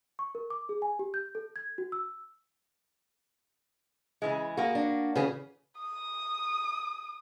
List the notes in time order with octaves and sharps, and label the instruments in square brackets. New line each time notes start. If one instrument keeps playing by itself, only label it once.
[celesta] C#6
A#4
D6
G#4
G#5
G4
G6
A4
G#6
F#4
E6
[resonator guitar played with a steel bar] C#3 E3 G#3
[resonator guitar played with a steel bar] A#3 F#4 [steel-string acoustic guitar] G#4
[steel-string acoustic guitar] D4
C#3 E3 G#4
[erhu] D#6